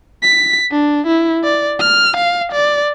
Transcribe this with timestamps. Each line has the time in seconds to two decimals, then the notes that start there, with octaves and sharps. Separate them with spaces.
0.23 B6
0.71 D4
1.07 E4
1.44 D5
1.80 F6
2.16 F5
2.52 D5